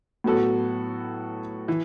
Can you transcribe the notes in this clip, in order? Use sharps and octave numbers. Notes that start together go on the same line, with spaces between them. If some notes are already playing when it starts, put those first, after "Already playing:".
A2 F#3 B3 F#4 A4
E3